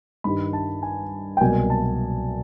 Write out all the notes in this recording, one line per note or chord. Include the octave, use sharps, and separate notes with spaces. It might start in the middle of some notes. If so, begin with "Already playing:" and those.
G2 D#3 G3 B5
A5
G#5
G5
C2 B2 F#3 A#3 G#5
A5